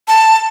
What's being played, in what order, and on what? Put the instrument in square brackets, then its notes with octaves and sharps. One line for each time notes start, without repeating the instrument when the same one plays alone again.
[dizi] A5